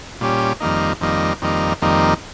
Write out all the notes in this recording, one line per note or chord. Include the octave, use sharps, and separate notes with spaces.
A#2 G3 C#4 G4
F2 D#3 G3 A#3 D#4
F2 D#3 G3 A#3 D#4
F2 D#3 G3 A#3 D#4
F2 D#3 G3 A#3 D#4